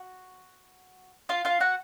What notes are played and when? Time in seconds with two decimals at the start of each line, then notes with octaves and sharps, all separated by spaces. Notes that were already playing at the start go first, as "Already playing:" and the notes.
Already playing: F#4
1.29 F4 F5
1.45 F4 F5
1.60 F#4 F#5